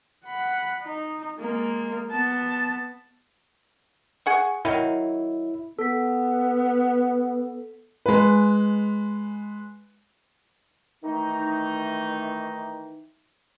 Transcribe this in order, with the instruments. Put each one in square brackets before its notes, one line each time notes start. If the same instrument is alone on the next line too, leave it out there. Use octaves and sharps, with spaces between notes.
[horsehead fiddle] F#5 B5
D#4
G#3 A#3
B3 A5
[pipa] G#4 F#5 C#6
[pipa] D#3 F#3 [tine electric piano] E4
[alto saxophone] B3 [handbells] A4 B6
[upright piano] G#3 B4
[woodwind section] D#3 E3 A3 D#4